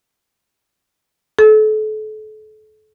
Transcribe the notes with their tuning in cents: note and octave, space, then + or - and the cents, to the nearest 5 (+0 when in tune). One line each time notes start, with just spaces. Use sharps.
A4 -35